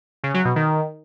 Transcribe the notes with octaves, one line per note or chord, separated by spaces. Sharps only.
C#3
F#3
B2
D#3